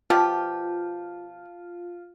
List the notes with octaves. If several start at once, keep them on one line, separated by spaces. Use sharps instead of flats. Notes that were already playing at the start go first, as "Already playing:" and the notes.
B2 F3 F4 G4 A5